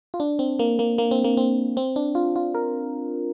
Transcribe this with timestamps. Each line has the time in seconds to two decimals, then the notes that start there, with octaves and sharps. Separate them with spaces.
0.14 F4
0.20 D4
0.39 C4
0.59 A#3
0.79 A#3
0.98 A#3
1.11 C4
1.24 A#3
1.37 C4
1.77 C4
1.96 D4
2.15 F4
2.36 F4
2.54 A#4